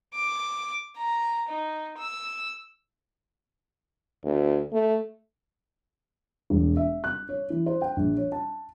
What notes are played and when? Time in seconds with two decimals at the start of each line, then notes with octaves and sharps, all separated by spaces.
0.14 D6
0.98 A#5
1.49 D#4
1.98 E6
4.24 D2
4.72 A3
6.50 E1
6.77 E5
7.04 F#6
7.29 C#5
7.50 E3
7.66 C5
7.82 G5
7.96 A#1
8.17 C#5
8.32 A5